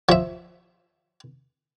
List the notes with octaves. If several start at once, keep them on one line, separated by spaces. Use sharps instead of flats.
F3 E5